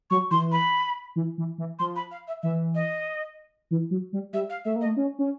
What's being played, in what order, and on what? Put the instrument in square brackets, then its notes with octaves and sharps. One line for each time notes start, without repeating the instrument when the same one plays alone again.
[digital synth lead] F#3 [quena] C#6
[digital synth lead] E3 [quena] C6
[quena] B5
[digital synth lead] E3
E3
E3
[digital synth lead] F3 [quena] C6
[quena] B5
F5
E5
[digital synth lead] E3 [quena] E5
[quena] D#5
[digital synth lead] E3
F#3
G3
[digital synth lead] G3 [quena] E5
[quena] F5
[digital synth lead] A3 [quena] E5
[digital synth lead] A#3
[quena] D#5
[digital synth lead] A3
C#4
C#4